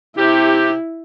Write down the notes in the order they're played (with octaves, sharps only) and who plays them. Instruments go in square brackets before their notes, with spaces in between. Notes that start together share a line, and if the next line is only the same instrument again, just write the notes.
[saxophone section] C3 G4 [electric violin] E4